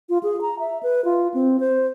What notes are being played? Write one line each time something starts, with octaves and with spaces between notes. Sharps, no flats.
F4
G#4
A#5
E5
B4
F4
C4
C5